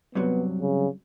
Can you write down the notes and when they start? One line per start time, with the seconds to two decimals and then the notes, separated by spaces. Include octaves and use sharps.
0.15 G2 C3 F#3 B3
0.62 C#3